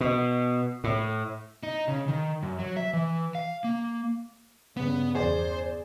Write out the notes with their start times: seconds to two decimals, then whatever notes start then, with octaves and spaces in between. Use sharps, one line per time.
0.01 B2
0.84 A2
1.63 D#4
1.88 C#3
2.08 D#3
2.43 F#2
2.59 F#3
2.76 E5
2.93 E3
3.35 F5
3.64 A#3
4.77 G2 C#3 B3
5.15 E2 G#4 C5 D5